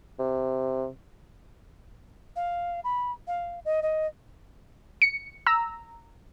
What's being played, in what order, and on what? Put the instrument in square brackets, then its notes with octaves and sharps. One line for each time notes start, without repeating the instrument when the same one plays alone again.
[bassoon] C3
[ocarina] F5
B5
F5
D#5
D#5
[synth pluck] C#7
A#5 E6